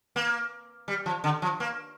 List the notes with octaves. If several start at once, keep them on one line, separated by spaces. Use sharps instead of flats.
A#3
G3
F3
D3
F3
A#3